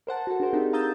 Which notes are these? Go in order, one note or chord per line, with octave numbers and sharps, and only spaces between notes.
A#4 C5 F#5 A5
F#4 A4
D4 F#4 G#4 A#4 C5
C4 D4 D#4 F4 G4 A4
F5 A#5 D#6 E6 G6 A6